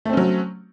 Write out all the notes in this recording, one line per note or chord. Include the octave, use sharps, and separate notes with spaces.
F#3 A3 C4 C#4